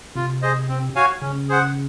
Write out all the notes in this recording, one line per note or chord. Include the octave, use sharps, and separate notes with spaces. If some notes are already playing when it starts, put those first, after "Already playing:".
C3 F4
G#4 C5 D#5
C4
F#4 C#5 F5 G#5
C#3 C#4
G#4 C5 F#5